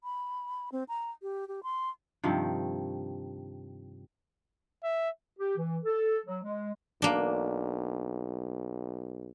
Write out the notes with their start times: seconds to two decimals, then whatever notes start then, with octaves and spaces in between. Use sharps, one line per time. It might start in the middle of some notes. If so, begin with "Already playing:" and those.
0.04 B5
0.72 C4
0.88 A#5
1.22 G4
1.48 G4
1.63 C6
2.24 G2 C3 D#3 F3
4.84 E5
5.38 G4
5.57 E3
5.84 A4
6.26 F#3
6.43 G#3
7.02 B1 A#3 D4